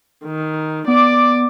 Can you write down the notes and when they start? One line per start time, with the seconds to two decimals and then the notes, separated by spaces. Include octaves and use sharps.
0.25 D#3
0.88 B3 D5 D6